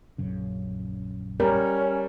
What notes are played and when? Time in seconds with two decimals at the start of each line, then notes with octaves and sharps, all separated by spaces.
0.18 A#1 F#2 C#3
1.40 G3 C#4 A#4